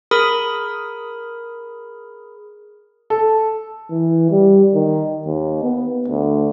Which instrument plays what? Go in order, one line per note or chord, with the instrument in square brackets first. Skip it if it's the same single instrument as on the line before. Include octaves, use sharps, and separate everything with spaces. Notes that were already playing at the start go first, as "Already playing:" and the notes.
[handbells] G#4 A#4 B5 D#6
[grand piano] A4
[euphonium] E3
G3
D#3
D#2
B3
D2